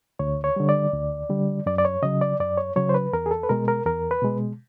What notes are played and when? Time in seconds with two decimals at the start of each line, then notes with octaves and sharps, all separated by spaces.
0.19 D2 C#5
0.44 C#5
0.56 D3 G3
0.69 D5
0.93 D2
1.29 D3 G3
1.66 F#2 D5
1.78 D5
1.85 C#5
2.03 C#3 F#3 D#5
2.21 D5
2.39 F#2 D5
2.57 C#5
2.76 C#3 F#3 C#5
2.89 C5
2.94 B4
3.13 E2 A#4
3.26 G#4
3.31 A4
3.43 B4
3.49 B2 G#3 A#4
3.68 A#4
3.86 E2 A#4
4.11 B4
4.22 B2 G#3